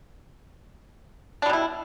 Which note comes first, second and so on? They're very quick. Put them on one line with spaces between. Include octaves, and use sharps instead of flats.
D4 G3 B2 E4